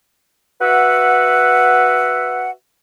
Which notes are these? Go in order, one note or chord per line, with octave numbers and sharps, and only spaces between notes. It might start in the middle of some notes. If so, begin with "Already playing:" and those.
F#4 B4 E5 F#5